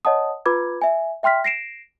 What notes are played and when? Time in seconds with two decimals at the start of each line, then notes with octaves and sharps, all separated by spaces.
0.05 C#5 D#5 F#5 A5 D#6
0.46 F4 B4 B5 D6 G#6
0.82 E5 G#5
1.23 E5 G5 C6 F6 B6
1.44 A#6 C7 D7 E7